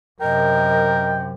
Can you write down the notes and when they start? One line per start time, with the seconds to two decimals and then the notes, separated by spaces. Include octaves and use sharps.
0.21 F#2 C3 A#4 D#5 G5